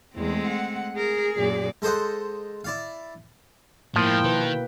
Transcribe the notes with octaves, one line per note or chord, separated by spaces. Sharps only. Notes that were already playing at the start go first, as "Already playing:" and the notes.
E2 G#3 A3 C4
F#5
G#4 A#4
F#2 A#2 D5
G#3 A4 C5 D#5 F#5
E4 D5 F5
A2 F3 G#3 A#3 E4 G5
B2 D#3 B4